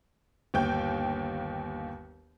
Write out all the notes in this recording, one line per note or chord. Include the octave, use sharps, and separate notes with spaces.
G1 D#2 G5 G6